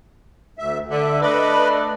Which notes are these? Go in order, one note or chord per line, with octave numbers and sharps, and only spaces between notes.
D2 E5
D3 E5
A3 D4 B4 D#5 B5